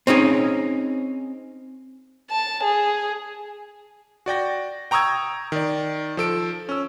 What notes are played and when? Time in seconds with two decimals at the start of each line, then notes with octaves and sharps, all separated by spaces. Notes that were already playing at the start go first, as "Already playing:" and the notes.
0.07 C4 C#4 D#4 G#4
2.31 A5
2.63 G#4
4.26 F#4 D5 G5 A#6
4.91 G5 A#5 C#6 D#6 E6 G#6
5.52 D#3 D5
6.17 F3 A4 D7
6.69 C#4 E6